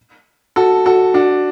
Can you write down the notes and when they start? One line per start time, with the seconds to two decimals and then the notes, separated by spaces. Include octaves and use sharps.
0.56 F#4 A4
0.86 F#4 A4
1.14 D4 F#4